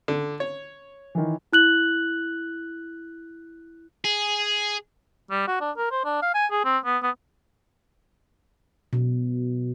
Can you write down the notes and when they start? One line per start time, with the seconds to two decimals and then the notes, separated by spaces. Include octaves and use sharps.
0.08 D3
0.40 C#5
1.15 D#3 E3
1.53 E4 F#6 F#7
4.05 G#4
5.31 G3
5.48 F#4
5.61 D4
5.77 A#4
5.91 C5
6.05 D4
6.22 F5
6.35 G#5
6.51 G#4
6.65 C4
6.85 B3
7.03 B3
8.93 B2